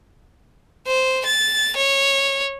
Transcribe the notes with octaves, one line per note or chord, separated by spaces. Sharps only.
C5
A6
C#5